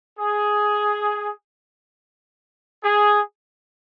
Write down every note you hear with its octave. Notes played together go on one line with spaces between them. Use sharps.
G#4
G#4